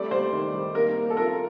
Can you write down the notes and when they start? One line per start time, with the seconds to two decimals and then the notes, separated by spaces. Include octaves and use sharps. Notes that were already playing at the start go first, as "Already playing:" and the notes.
Already playing: G3 A3 D5
0.11 G3 C5
0.33 D#3
0.54 G3
0.74 A#3 A#4
0.96 A#3
1.10 A4
1.16 F4 A#4